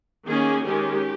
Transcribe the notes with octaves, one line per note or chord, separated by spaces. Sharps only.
D#3 A#3 C#4 G#4
D#3 G#3 C#4 G4